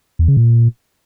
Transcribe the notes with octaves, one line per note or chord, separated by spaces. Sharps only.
E2
C#3
A#2